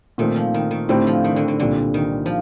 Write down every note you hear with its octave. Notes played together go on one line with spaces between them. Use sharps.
A#2 D#3 A3 C4
F3
D#3
D#3
A2 D3 A3 C4 G4
F3
D#3
D3
D3
C2 A#2 D3 G3 C4
D#3
F3